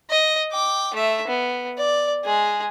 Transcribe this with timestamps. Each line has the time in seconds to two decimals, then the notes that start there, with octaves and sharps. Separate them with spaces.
0.10 D#5
0.52 G5 D6
0.94 A3 E5
1.28 B3
1.78 D5
2.25 G#3 G#4